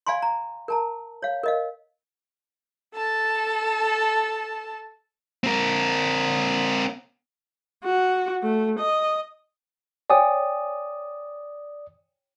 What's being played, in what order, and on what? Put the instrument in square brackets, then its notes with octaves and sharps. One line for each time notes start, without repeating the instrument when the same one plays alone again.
[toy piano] D5 F5 G#5 B5 C6
A#5
A#4 A5 A#5
C#5 F5
A#4 D#5 F5
[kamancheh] A4 A5
[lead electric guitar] C4 A#4
[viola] F#4
A3
D#5
[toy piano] C#5 G5 G#5 [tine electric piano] D5 D#6